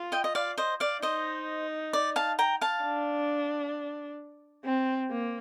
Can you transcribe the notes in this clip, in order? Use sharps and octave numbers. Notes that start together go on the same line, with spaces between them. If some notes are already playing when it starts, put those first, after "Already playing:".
Already playing: F4
D#5 G5
D#5
D5 F5
C5 D#5
D5 F5
D#4 C5 D#5
D5
F5 A5
G5 A#5
F5 A5
D4
C4
A#3